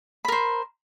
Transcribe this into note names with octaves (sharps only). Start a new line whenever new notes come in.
A#4 C5 B5